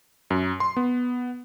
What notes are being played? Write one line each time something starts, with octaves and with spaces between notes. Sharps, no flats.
F#2
C6
B3